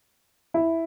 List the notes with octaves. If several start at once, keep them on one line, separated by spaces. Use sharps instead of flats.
E4